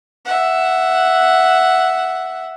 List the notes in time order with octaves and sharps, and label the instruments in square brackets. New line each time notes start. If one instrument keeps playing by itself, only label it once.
[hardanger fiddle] E5 F#5